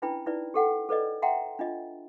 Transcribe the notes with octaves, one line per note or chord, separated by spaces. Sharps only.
C#4 D4 E4 B4 G5 B5
D#4 E4 B4 D5
G4 A4 F#5 G5
A4 B4 D5 D#5
E5 F#5 G5 A#5 C6
D4 F4 D#5